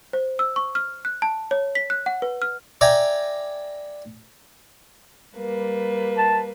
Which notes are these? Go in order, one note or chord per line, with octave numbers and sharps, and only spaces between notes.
C5
E6
C#6
F6
F#6
A5
C#5
B6
F#6
F#5
B4
F6
D5 E5 G5 G#5 A#5
G3 A#3 B4
A5